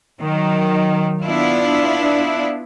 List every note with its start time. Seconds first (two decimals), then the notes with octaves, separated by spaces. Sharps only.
0.21 D#3 F#3
1.23 B3 D4 E4 F4